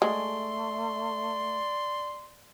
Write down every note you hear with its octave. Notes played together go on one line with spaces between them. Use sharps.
G#3 A3 D5 C6